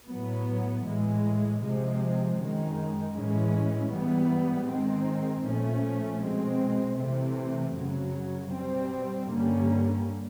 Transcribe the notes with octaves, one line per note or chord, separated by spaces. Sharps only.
A2 F#3 B3
A2 E3 G#3
C3 F3 G#3 C4
F#2 D#3 G#3
A2 E3 G#3 C#4
G#2 E3 G3 B3
G#2 D#3 G#3 C4
A#2 F3 A3 C#4
B2 G#3 C4
C3 E3 A3 C4
F#2 C#3 F#3
B2 G3 C4
G2 D3 G3 A#3 C#4